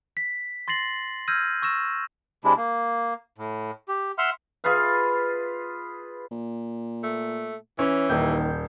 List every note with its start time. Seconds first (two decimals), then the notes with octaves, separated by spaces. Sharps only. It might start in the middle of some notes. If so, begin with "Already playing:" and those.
0.17 B6
0.68 C6 A6 A#6 C7 F#7
1.28 E6 F6 G6 G#6 A#6 D#7
1.62 C#6 E6 A#6 E7
2.44 C3 G#3 D4 E4
2.57 A#3
3.38 A2
3.88 G4
4.18 E5 F#5 C6 F6
4.64 F4 G#4 B4 F5
6.31 A#2
7.03 A3
7.79 E3 C#4 C#5
8.10 D#1 D#2 D#3 G6